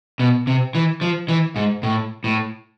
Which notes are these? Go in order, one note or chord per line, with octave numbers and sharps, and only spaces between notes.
B2
C3
E3
F3
E3
G#2
A2
A2